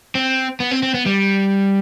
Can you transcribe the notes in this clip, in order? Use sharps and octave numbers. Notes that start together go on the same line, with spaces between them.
C4
B3
C4
C4
B3
G3